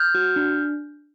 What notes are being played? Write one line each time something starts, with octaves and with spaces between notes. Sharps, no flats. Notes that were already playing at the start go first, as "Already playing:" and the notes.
Already playing: F6 G6
F#4
D4